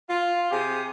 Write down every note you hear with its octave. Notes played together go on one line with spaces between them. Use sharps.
F4
C3 G4 G#4